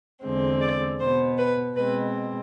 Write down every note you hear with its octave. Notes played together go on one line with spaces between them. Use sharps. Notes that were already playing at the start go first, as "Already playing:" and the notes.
E2 D3 G#3 C4
D5
B2 B3 C5
B4
B2 G#3 C4 B4